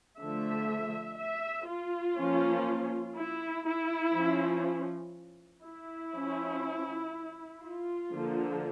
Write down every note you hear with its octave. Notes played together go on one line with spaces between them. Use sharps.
D3 F3 A3 E5
E5
F4
F3 A#3 C#4
E4
E4
F3 C#4
E4
F3 C#4
F4
D3 F3 A#3